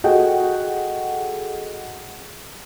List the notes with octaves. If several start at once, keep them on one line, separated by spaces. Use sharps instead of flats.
F#4 G#4 A4 D#5 F#5 G5